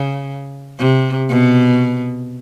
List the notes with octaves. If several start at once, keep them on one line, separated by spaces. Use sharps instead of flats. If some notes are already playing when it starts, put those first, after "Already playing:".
Already playing: C#3
C3
B2